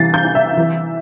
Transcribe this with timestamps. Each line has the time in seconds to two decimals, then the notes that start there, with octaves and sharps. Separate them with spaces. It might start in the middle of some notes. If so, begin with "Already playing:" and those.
Already playing: C3 E3 G3 A6 C7
0.14 G6
0.25 E4
0.35 E5
0.57 E3